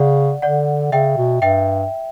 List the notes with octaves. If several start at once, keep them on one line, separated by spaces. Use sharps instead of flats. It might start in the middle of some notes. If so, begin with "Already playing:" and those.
Already playing: C#3 D5 F#5
D3 D5 F#5
C#3 E5 G5
B2
G2 E5 G5